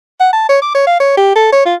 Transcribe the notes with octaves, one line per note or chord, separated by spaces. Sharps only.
F#5
A5
C#5
D6
C#5
F5
C#5
G4
A4
C#5
F4